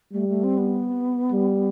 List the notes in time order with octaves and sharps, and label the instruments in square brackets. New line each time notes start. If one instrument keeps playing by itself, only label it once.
[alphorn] G3 [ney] A3
[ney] A3
C4
B3
[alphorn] G3